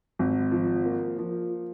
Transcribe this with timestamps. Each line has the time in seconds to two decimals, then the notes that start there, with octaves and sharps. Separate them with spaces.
0.19 G#1
0.51 F3
0.86 A#3
1.18 F3